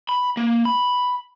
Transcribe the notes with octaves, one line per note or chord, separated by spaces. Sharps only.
B5
A#3
B5